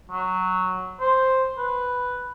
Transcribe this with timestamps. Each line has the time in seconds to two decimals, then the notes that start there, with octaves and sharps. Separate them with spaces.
0.11 F#3
1.00 C5
1.58 B4